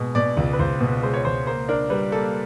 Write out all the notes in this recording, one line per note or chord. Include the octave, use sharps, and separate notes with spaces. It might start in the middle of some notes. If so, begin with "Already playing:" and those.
Already playing: B2 G#3
B2 D5
C#2
B4
C#2 C5
B2
G#3 C5
C#5
C#2 C5
A#3 C5
D4 A#4
G3 B4
A#3 A4